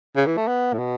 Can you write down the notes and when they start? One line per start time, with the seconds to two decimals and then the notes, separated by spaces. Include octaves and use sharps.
0.16 C#3
0.27 E3
0.37 A3
0.48 B3
0.73 A2
0.79 B2